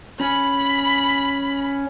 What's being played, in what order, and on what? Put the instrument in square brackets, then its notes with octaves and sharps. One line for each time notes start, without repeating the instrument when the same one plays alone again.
[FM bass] C#4 [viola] B5